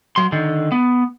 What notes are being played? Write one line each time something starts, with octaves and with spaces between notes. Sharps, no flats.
F#3 C6
D3 D#3
B3